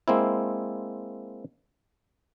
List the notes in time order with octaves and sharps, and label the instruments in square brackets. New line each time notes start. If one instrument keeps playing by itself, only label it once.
[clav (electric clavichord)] G#3 A#3 C4 E4